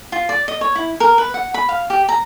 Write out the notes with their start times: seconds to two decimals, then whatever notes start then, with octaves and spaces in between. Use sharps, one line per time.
0.12 F4
0.29 D5
0.48 D#5
0.61 C#5
0.75 E4
1.00 A#4
1.18 B4
1.34 F#5
1.54 B5
1.69 F5
1.90 G4
2.09 A#5